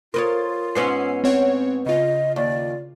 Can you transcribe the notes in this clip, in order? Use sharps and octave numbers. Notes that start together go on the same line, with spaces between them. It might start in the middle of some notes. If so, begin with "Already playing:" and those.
F4 A#4 B4 C#5 C6 D#6 A6
G#2 B3 C#4 C6 E6 C7
C4 C#5 F#5
C#3 F4 D#5
D#2 D5